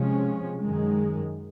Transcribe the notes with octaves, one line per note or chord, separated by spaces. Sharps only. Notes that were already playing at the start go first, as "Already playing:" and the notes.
Already playing: C3 F3 G#3 C#4
F#2 D#3 G#3